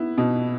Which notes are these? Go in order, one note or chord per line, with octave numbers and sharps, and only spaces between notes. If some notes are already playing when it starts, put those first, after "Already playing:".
Already playing: B3 E4
B2